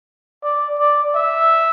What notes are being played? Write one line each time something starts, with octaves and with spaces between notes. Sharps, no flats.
D5
D5
E5